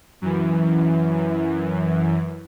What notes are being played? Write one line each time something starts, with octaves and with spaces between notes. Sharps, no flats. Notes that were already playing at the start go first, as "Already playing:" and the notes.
F#2 E3